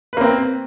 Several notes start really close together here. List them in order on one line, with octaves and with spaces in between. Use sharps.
B4 A#3 C4